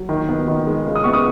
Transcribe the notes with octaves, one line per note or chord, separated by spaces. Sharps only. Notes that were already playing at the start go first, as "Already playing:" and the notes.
Already playing: F#3
D#3
B3
D#3
G#3
C#3
D#6
B3 C#6
D#6